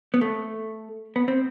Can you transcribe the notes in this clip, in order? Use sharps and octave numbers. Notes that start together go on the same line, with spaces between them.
B3
A3
B3
C4